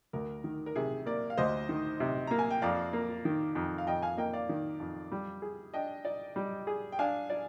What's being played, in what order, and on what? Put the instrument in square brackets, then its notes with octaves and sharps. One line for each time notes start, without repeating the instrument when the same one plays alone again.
[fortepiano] D2 [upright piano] A#4
[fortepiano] D#3
[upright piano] A#4
[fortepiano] C3 [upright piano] G#4
[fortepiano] A#3 [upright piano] A#4 D5
[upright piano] F5
[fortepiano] D2 [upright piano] C5 D#5
[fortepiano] D#3
C3
[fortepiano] A#3 [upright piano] A#5
[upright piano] G#5
G5
[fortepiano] F2 [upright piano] D5 F5
[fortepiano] A#3
D#3
F2
[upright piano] F5
[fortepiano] F2 [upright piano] D#5 G5
[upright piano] F5 G#5
[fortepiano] A#3 [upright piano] D#5 G5
[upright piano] D5 F5
[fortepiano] D#3
F2
G3
G#4
[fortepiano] D4 [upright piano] D#5 G5
[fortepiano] D5
G3
G#4
[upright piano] G5
[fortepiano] D4 [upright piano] F5 G#5
[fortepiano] D5